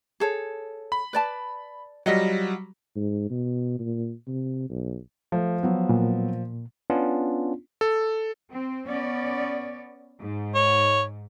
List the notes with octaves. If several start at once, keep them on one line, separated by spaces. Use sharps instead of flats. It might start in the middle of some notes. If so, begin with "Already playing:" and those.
G#4 A4 C#5
B5
B4 D5 A5
F#3 G3 F4 D#5 F#5
G#2
B2
A#2
C3
B1
F3 A3
F#3 B3
A#2
B3 C#4 D4 F4
A4
C4
B3 C#4 D5
G#2
C#5